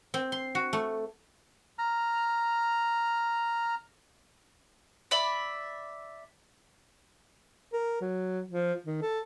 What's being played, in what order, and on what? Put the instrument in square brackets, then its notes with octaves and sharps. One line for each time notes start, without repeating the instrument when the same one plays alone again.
[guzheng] C4
C6
F#4
A3
[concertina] A#5 F6
[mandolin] D5 E5 B5
[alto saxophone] A#4
F#3
F3
D#3
A4